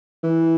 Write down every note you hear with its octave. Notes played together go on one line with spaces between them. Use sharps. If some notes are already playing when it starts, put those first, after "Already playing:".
E3